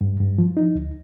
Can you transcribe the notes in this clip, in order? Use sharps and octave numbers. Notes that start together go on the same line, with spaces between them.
G2
G2
F3
D#4
D2